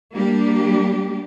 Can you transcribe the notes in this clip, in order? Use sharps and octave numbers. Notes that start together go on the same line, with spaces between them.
G3 A#3 D4 G4